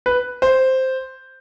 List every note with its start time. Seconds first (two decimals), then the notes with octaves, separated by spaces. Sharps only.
0.06 B4
0.42 C5